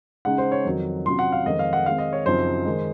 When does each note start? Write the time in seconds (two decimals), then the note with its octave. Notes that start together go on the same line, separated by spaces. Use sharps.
0.25 C#3 G#3 D#4 F#5
0.38 C5
0.52 C#5
0.65 F2 D#3 F#3
1.06 C3 F#3 C#4 F4 C6
1.19 F#5
1.32 F5
1.46 F2 D#3 G#3 C4 D#5
1.59 F5
1.73 F#5
1.85 D#3 G#3 C4 F5
1.98 D#5
2.13 C#5
2.26 F#2 C#3 F3 C4 D#4 C5
2.65 D#3 G#3